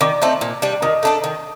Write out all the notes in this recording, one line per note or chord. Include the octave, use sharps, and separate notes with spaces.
D#3 D5 D6
A3 C4 D#4
A#2
G3 D4
D#3 D#5 D#6
A3 D4 A4
D#3